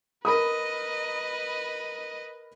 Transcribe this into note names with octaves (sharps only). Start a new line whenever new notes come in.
A#4 B4 D#5 B5 D#6